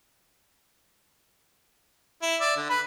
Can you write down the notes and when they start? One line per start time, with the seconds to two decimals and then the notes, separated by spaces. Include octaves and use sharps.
2.22 E4
2.41 D5 E5
2.57 D3
2.70 B4 B5